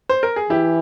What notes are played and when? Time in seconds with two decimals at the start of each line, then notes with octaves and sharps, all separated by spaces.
0.09 C5
0.23 A#4
0.36 G#4
0.49 E3 E4 G4